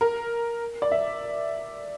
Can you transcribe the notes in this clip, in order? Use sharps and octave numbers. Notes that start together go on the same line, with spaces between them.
A#4
D5
E5